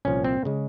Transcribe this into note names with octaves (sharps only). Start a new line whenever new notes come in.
C2 A#2 F3 C#4
C4
C#3 G#3